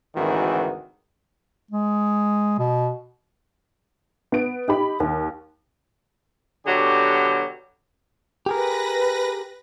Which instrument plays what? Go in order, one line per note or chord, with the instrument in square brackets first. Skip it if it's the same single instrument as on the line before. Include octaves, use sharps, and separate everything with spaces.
[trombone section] G#1 D2 D#3 E3 F#4
[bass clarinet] G#3
B2
[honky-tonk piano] B3 D7
D#4 G4 B5
D#2
[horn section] B2 D3 F#3 G4
[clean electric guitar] G4 G#4 A#4 [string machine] B4 A#6